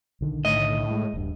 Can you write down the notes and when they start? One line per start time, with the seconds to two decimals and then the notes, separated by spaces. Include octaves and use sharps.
0.21 B1 D3 D#3
0.45 A2 D#5
0.91 G#3
1.14 D#1 G2